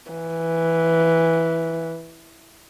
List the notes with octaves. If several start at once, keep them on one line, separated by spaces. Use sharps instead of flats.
E3